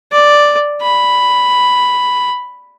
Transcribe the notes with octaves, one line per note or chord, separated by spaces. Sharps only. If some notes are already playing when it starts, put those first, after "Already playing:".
D5
B5